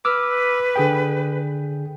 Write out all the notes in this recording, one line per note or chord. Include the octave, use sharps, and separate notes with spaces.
B4 D6 E6 F6
D3 G#4 G5